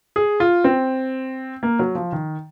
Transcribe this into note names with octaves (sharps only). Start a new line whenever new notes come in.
G#4
F4
C4
A#3
F#3
F3
D#3